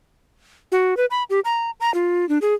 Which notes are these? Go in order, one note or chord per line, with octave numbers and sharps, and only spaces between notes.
F#4
B4
B5
G4
A#5
A#5
F4
D4
G#4